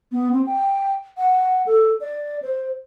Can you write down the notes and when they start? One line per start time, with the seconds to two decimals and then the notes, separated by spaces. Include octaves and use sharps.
0.12 B3
0.32 C4
0.46 G5
1.17 F#5
1.66 A4
2.00 D5
2.42 C5